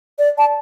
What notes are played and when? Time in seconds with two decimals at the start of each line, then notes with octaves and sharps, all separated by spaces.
0.19 D5
0.38 A5